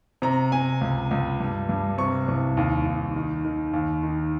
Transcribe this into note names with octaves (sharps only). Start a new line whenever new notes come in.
C3 A#5
C3 G#5
C#2
C#2
G2
G2
C3 C#6
C2
D#2
D#2
D#3
D#3
D#2
D#3